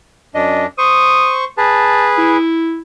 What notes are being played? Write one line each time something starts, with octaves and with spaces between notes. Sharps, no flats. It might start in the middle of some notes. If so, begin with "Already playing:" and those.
F#2 D4 D#5
C5 C#6 D#6
G#4 B4 A5
E4